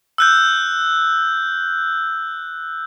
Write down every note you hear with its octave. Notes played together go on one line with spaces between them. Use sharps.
E6 F#6 G6